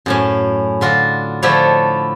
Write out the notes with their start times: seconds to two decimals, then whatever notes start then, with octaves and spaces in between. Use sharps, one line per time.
0.06 F#2 A2 C#4
0.81 D3 F4 F#4
1.42 D3 F3 A3 D4 E4 C#5